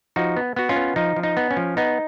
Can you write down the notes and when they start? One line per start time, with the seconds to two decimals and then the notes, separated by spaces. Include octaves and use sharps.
0.16 F3 D#4 F#4
0.37 B3
0.56 B3 F#4
0.69 C#4 F4
0.76 B3
0.96 F3 D#4
1.16 F3
1.23 D#4
1.37 B3
1.51 C#4
1.57 F3
1.77 B3 D#4